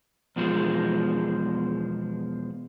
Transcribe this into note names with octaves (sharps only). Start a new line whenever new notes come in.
E2 B2 F3 G#3